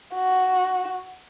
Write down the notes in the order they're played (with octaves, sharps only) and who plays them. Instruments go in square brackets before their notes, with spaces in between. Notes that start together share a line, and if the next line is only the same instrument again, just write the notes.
[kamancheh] F#4